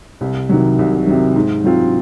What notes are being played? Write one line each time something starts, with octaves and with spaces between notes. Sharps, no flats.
C2
C3 D#3 F#3
C2
C3 D#3 F#3
G#2
F#3 C4 F4